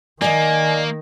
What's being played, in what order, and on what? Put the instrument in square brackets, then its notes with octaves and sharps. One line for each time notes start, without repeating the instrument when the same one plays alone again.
[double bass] D#3 [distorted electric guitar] A#3 [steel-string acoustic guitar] D5 D#5 [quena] G#5